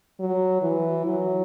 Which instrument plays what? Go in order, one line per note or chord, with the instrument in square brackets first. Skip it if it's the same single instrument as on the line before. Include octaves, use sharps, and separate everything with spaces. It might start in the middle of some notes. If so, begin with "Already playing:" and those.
[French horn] F#3
E3
F#3